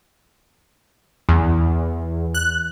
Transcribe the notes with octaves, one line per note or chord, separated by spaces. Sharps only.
E2
F#6